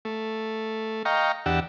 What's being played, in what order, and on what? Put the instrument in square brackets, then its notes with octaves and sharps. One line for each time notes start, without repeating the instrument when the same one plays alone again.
[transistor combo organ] A3
D#5 F5 G5 A#5 C#6
E2 D4 G4 F#5 E6